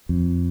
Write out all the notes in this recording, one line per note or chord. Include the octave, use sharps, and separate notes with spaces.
F2